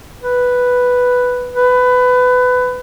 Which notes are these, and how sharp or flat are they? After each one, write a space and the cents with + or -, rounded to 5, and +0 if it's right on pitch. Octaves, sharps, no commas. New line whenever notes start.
B4 +0
B4 +20